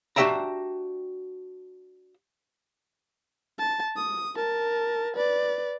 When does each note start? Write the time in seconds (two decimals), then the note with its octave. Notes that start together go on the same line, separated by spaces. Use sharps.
0.16 D4 F#4 G4 E5 G5 A#5
3.59 A5
3.96 D#6
4.36 A#4 A5
5.16 B4 D5